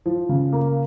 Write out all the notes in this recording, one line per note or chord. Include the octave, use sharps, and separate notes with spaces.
F3
C#3
A#3